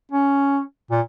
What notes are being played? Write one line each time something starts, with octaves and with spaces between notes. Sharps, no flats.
C#4
A#2